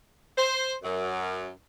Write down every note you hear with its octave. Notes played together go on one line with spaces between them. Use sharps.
C5
F#2